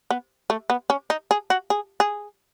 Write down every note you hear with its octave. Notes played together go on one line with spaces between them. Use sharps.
B3
A3
B3
C#4
D#4
G#4
F#4
G#4
G#4